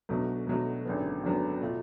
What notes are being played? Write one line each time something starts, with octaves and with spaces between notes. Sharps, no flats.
B1 B2 F#3 A3 D4
B1 B2 F#3 A3 D4
G#1 F#2 D3 F#3 B3
G#1 F#2 D3 F#3 B3
B2 A3 F4